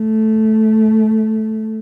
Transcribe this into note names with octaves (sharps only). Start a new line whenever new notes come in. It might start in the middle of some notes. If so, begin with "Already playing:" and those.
Already playing: A3